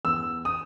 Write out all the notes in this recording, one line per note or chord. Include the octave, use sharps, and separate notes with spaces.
E2 E6
D#6